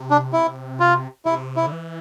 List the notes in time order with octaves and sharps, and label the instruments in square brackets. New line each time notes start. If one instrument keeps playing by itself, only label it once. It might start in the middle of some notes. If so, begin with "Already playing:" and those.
Already playing: [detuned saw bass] C3
[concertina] D4
E4
F4
[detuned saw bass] C3 [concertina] E4
[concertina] E4
[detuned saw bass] D3
E3